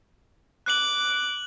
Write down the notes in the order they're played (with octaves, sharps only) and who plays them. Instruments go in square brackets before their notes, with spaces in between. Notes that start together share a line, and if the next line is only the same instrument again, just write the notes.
[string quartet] D6 [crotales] F#6 F#7